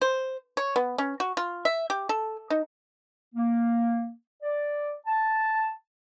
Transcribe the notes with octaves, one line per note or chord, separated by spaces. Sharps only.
C5
C#5
B3
C#4
F#4
F4
E5
G4
A4
D#4
A#3
D5
A5